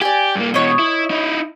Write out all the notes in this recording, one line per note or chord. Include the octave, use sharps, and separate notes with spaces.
G4 D5 G#5
G2 A#3
B2 E3 C#5 D#5
E4
D#4 E4